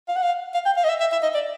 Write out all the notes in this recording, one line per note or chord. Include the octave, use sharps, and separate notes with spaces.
F5
F#5
F5
F5
G5
F5
D#5
E5
E5
E5
D#5
D5